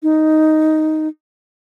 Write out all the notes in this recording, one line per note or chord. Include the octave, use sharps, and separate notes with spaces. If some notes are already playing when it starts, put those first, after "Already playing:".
D#4